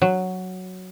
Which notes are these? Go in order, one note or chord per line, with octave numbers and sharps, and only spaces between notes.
F#3